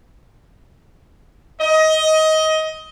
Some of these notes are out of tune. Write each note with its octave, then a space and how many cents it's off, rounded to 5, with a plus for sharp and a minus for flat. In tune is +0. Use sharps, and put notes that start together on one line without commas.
D#5 +20